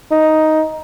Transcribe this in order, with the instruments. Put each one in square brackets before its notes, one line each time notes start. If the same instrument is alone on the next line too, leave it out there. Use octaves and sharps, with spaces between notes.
[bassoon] D#4